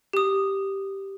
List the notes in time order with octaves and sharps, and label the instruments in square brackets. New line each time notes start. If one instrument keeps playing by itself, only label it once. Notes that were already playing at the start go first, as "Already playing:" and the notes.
[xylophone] G4 D#6